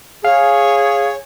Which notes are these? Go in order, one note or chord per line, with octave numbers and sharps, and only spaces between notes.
G#4 C#5 F5